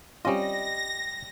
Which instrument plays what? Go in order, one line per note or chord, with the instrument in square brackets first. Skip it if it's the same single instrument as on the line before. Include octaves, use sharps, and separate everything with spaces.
[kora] G3 D#5 [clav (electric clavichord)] C4 C#4 F4 [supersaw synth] A#6